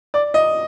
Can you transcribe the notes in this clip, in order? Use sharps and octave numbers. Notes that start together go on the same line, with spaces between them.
D5
D#5